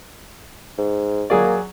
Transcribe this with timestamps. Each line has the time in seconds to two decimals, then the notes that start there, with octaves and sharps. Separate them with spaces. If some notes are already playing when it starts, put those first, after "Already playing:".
0.78 G#2
1.30 F#3 A#3 G#4 D5